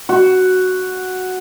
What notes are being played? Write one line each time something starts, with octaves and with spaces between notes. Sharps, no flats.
F#4